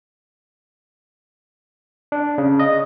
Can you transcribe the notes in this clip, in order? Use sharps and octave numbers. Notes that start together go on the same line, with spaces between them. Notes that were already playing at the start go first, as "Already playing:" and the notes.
D4
C#3
D#5